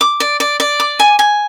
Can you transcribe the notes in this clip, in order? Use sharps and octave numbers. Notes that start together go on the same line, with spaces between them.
D6
D5
D5
D5
D6
G#5
G#5